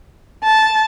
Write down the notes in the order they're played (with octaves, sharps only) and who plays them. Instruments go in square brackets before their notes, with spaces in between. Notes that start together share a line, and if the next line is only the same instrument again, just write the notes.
[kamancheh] A5